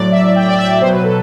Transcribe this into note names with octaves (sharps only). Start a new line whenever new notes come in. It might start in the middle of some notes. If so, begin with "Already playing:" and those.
Already playing: A2 F#3 D5
E5
G5
D5
E5
D5
B2 F#3 C5
B4
A4